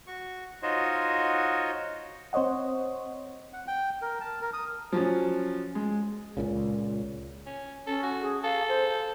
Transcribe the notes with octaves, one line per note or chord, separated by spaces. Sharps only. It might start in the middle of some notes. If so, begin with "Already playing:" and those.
F#4 C#6
D#4 F4 F#4 C5 C#5 D#5
C4 C5 C#5 D#5 F#5
F#5
G5
A#4
A5
A#4
D#6
F3 F#3 C#4
G#3
C#2 A#2 C#3
C#4
C#4 A4
F#4
G#4
A4 F5
C5